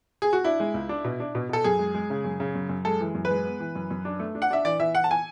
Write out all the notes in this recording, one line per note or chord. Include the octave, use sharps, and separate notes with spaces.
G#4
F#4
D4 E4
G#3
C#2
D4
B2
D4
B2
B2 A4
F#2 G#4
G#3
G#3
C#3
F#2
C#3
F#2
F#2
G#3 A4
E3
F#2
B4
G#3
B3
E3
F#2
F#2
D4
A3
D4
F#5
D4 E5
E3 D5
E3 E5
E3 F#5
A5
G#5